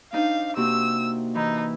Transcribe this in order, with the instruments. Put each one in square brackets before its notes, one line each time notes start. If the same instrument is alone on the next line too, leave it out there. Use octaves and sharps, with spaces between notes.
[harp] D4 D#4 C5 [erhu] F5
[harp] C3 A#3 F#4 [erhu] E6
[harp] E3 [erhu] D#4